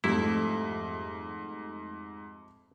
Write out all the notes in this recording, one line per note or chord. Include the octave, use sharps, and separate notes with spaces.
F2 G#2 G3 A3 E4